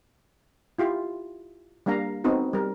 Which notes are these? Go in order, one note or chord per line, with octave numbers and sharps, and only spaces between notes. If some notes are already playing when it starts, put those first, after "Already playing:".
E4 F4 G4
G3 A#3 D4 F5 A#5
B3 C4 D#4 F#4 A4
G3 A#4